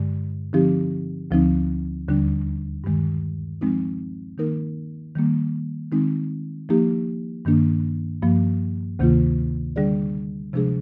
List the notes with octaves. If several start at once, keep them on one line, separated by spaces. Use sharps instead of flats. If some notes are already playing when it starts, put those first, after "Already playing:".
Already playing: G2 D3 G#3
D3 F3 C4 D#4 G4
D2 D3 F3 C4 D#4
D#2 D3 G3 D4
G2 D#3 G#3
F3 G#3 C4 D#4
D#3 A#3 D#4 A#4
D#3 G3 A#3
D#3 G#3 C4 D#4
F3 A#3 D#4 G4
G2 D#3 A#3 D4
G2 F3 A#3
D2 C3 D#3 A#3 F4
D3 G3 D4 G#4 D5
C3 F3 G#3 D4 G#4